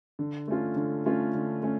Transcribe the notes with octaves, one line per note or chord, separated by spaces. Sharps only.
D3
A3 C#4 F4
D3
A3 C#4 F4
D3
A3 C#4